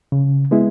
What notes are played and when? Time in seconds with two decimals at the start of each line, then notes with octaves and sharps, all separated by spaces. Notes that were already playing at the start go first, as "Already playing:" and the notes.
0.12 C#3
0.51 G#3 B3 E4